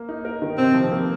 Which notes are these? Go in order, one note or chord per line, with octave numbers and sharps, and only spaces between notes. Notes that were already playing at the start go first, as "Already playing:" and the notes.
Already playing: A#3
D#4
A#4
D#3
C3 C4
F3
A#3